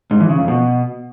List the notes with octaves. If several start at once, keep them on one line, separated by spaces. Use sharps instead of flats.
G#2
E3
C#3
F2
B2